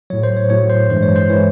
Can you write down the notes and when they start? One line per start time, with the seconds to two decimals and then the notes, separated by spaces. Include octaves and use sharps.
0.10 A2 F#3 C#5
0.23 C5
0.37 C#5
0.50 A2 F#3 C#5
0.69 C5
0.90 G2 E3 G#3 C5
1.03 C#5
1.16 C5
1.29 E3 G#3 C#5